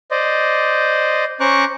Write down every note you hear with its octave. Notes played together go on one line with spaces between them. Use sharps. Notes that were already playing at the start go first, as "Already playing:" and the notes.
C5 D5 D#5
C#4 C5 A#5 C#6 D6 F#6